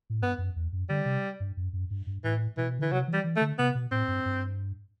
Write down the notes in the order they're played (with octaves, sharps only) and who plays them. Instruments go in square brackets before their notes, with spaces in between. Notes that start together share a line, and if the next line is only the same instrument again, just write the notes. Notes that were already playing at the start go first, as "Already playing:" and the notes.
[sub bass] A2
[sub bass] G2 [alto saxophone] B3
[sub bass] F#2
E2
F#2
[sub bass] D3 [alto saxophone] G3
[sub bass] C3
G2
F#2
F#2
G2
G2
[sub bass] A2 [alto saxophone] E3
[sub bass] B2 [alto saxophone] E3
[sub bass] D3 [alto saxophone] E3
[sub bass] C3 [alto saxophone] F#3
[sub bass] E3
[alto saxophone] G3
[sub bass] E3
[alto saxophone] A3
[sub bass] D3
[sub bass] C3 [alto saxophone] B3
[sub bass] B2
[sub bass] A2 [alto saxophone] C4
[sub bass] G2
G2